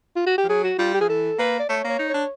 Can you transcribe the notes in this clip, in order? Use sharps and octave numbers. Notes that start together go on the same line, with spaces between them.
F4
F#4
G4
F3
F#3 G#4
F#4
G3 F4
G4
F3 G#4
E3 A4
A#3 B4
D5
A3 C#5
A#3
C#5
D#4
D4 C#5